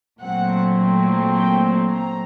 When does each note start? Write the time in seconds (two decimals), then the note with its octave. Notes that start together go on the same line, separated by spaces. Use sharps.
0.22 A#2 F#3 A3 C4 F#5
1.36 G5
1.95 A#5